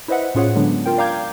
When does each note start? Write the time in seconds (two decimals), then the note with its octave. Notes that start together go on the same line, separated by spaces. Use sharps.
0.08 E4 B4 C5 D#5 E5 F#5
0.35 A2 C#4 F4 G#4 C#5 F#5
0.56 D3 F#3 G#3 B3 D4
0.86 F4 A#4 G5
0.98 D5 F5 A#5 D6 G6 G#6